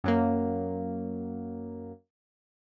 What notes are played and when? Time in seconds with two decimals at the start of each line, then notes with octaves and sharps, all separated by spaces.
0.04 F#2 F#3 A#3